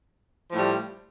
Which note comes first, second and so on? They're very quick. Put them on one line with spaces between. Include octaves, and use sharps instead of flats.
F3 A2 G3